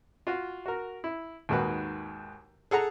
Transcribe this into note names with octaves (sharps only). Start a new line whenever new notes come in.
F4 F#4
F#4 A#4
E4
D#2 G#2 D#3 F#4 B4
G#4 A4 F#5 A#5